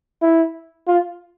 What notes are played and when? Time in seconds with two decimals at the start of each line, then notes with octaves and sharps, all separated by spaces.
0.22 E4
0.88 F4